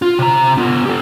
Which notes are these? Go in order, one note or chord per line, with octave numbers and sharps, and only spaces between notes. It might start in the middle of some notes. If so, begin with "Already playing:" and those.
F4
C3 A#5
B3 F4
G4 A4